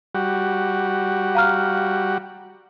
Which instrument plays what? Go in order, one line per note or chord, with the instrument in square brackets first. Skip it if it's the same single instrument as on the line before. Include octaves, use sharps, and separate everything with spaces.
[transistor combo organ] G3 F#4
[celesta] F5 A#5 F6